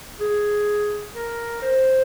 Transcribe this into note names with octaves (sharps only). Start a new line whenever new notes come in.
G#4
A#4
C5